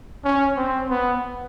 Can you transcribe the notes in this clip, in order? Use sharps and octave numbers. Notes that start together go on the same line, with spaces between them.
C#4
C4
B3